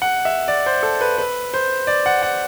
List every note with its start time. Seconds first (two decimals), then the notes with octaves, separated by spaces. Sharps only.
0.02 F#5
0.25 E5
0.48 D5
0.66 C5
0.83 A4
1.01 B4
1.18 B4
1.54 C5
1.87 D5
2.06 F#5
2.22 F#5